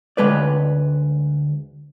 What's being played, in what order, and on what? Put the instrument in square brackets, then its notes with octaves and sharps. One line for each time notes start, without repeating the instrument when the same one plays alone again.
[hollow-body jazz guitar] D2 G#3 B4 D5